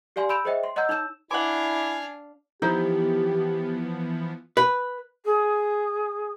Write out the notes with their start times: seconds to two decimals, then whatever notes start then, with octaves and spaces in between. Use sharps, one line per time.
0.16 G4 D5 F5 G#5 C6
0.29 B5 E6 G6 D7 E7 F7
0.45 G#4 C5 C#5 D#5 E5 G5
0.64 C6
0.76 C#5 D#5 F#5 A#5 E6 G6
0.89 D#4 C#5 A5 E6 G6 E7
1.31 D4 E4 F5 F#5 G#5 D6
2.62 E3 F3 B3 D#4 E4 G4 C5
4.57 B4
5.25 G#4